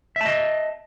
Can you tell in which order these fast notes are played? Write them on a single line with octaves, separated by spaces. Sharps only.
E5 A5 D#5